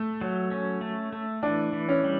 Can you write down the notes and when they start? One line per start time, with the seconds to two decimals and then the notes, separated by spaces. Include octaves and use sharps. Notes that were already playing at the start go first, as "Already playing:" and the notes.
Already playing: A3
0.21 F#3
0.52 C#4
0.81 A3
1.13 A3
1.43 E3 D4
1.73 E3
1.89 C#4
2.04 G3